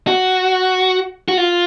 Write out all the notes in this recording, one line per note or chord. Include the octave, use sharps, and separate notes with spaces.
F#4
F#4
F4